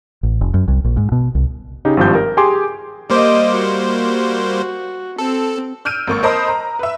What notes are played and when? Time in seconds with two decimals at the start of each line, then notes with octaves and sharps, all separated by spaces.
0.23 A1
0.41 F1
0.54 F#2
0.68 C2
0.84 A#1
0.97 G#2
1.12 B2
1.35 C2
1.85 C#3 D#4 G4
1.97 G#1 G2 F3 G4 G6
2.15 A#4
2.37 G4 G#4 G5 G#5 C6 D6
3.10 G3 A#3 C5 D#5 D6
3.53 F#4
5.18 C4 A4
5.85 E6 F6 G6 D7 D#7
6.07 G#1 A#3 C#6
6.23 A#4 C5 D#5 A5 B5 D#6
6.48 A#5
6.79 B4 E5